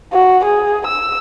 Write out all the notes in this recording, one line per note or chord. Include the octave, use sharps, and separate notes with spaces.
F#4
G#4
E6